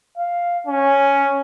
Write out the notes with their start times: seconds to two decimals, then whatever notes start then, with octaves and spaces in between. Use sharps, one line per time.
0.17 F5
0.66 C#4